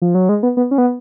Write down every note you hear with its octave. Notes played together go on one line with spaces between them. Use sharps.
F3
F#3
G#3
B3
B3
C#4
B3